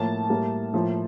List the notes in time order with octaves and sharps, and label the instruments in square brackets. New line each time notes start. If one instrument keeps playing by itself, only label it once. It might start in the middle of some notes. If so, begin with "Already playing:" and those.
Already playing: [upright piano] A2 F3 A#3 A5
A2 G3 A#3
A2 F3 A#3